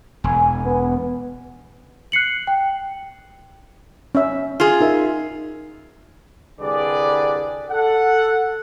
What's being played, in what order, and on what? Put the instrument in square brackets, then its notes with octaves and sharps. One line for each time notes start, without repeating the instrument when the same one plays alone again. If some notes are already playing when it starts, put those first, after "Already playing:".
[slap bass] E1 [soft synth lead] G#5
[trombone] B3
[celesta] F#6 C7 C#7 F#7
G5
[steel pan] C#4 E5
[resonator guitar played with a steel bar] F4 G#4
[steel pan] D#4 A#4 E5
[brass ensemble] C2 D3 G3 G#4 B4 D5
A4 F#5